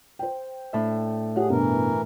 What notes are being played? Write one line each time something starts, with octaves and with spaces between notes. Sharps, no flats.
C5 G5
A2 D4 E5
G4 G#4 C#5 F#5
G2 B2 E3 A#4